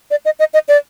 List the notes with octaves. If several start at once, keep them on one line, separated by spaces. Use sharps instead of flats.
D5
D#5
D#5
D#5
D5